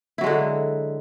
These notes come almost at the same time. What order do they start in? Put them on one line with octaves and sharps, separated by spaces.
E4 F#3 G#3 D3